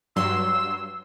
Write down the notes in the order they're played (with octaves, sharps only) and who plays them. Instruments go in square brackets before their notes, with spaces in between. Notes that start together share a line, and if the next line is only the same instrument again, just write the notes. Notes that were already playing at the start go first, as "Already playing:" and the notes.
[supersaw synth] G2 F#3 C6 [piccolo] E6